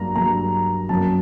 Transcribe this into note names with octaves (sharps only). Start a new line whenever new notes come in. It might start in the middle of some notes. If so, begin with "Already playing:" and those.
Already playing: G2 F#3 A#3 D4 A#5
G2 F#3 A#3 D4 A#5
F#2 F#3 A#3 A5